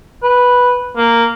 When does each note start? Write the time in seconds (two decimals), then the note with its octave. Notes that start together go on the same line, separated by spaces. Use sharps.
0.23 B4
0.97 A#3